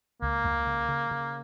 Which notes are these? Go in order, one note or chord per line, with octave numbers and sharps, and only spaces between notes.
C#2 A#3
C#2
C#3
C#3
C#3